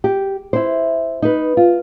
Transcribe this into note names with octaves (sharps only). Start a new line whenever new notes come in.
G4
E4 C5
D#4 B4
F4